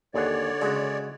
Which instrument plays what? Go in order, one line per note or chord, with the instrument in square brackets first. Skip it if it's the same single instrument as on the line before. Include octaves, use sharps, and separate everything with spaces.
[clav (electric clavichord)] D#2 G#4 F#5 [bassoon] D3 [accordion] C#5 D5
[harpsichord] C#3 [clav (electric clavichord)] G#3 F#4